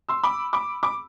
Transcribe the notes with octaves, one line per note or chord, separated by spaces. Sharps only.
C6 E6
B5 D6
B5 D6
B5 D6